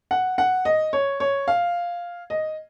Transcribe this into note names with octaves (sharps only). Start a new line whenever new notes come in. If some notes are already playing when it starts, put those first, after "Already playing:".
F#5
F#5
D#5
C#5
C#5
F5
D#5